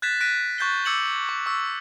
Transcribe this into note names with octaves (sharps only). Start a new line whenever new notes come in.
F#6 G#6 A6 B6 E7
F#6 A#6 B6 D7 D#7
C#6 F#6 G6 A6 C7 G7
D6 E6 G#6 C#7 E7 F#7
C#6
C#6 E6